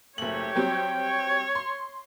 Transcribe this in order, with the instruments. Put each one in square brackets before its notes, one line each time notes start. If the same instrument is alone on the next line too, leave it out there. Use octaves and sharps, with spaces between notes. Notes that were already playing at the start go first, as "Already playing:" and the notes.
[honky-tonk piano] F#1 F#7 [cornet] A3 [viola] G4 C#5
[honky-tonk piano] F#3 G3 C4 [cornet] G5
[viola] C#5
[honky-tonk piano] C6